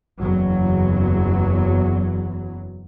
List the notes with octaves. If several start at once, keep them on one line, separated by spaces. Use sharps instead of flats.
F#1 E2 F#3